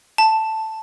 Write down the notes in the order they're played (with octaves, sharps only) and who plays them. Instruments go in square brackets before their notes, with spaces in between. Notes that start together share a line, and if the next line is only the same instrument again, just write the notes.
[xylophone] A5